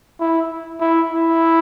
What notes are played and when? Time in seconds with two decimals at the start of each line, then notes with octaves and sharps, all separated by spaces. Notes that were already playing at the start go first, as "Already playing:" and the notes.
0.20 E4
0.81 E4
1.10 E4